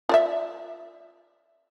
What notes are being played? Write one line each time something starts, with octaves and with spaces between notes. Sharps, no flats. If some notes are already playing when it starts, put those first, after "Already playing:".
F4 D5 E5